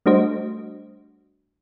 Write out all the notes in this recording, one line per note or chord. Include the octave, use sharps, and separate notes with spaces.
G3 A3 D4 F#4 C5 D#5